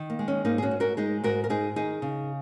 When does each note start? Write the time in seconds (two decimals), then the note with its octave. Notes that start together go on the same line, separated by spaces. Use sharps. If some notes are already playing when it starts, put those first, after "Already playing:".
Already playing: D#3
0.10 A#3
0.19 G#3
0.28 C#4
0.45 G#2 A#3 D#4
0.58 G#4
0.62 C#4 F#4
0.71 G#2
0.80 F#4 A#4
0.97 G#3 D#4 G#4
1.24 G#2 F#4 A#4
1.44 A#4
1.50 G#2 D#4 G#4
1.76 D#3 D#4 G#4
2.02 C#3